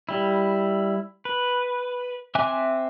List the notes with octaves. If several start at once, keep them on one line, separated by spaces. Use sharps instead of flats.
G3 E4
B4
C4 E5 G#5 D6 F#6